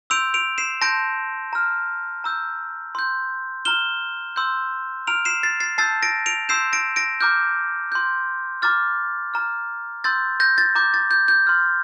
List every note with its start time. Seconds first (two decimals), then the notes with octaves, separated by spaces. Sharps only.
0.10 C6 E6 G6 D7 F7
0.34 D7 F7
0.58 C7 E7
0.81 A5 C6 G6 A#6 D7
1.53 A#5 F6
2.24 A#5 E6 G6
2.95 C6 G6
3.65 A#5 F6 E7 G7
4.36 C6 E6 G6
5.07 A#5 F6 D7 F7
5.25 C7 E7
5.43 A6 C7
5.60 A6 C7
5.78 A5 E6 G6 A6 C7
6.02 A#6 D7
6.26 D7 F7
6.49 C6 E6 G6 C7 E7
6.73 A#6 D7
6.96 A#6 D7
7.21 A#5 D6 F6 G6
7.92 C6 G6
8.62 A#5 D6 F6 A6
9.34 A#5 F6
10.04 C6 E6 G6 A6
10.40 G6 A#6
10.58 A6
10.75 A#5 D6 G6
10.94 A6
11.11 G6
11.28 G6
11.47 C6 F6